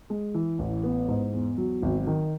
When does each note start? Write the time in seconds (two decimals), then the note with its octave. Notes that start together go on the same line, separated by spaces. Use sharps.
0.10 G#3
0.34 E3
0.59 A1
0.83 B3
1.08 G#2
1.33 E2
1.58 F#3
1.82 G#1
2.07 D#3